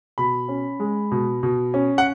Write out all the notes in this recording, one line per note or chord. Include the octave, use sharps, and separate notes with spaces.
B2 B5
C#4
G#3
B2
B2
C#4
F#5